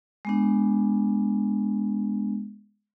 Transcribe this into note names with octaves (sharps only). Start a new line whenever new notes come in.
G#3 B3 D4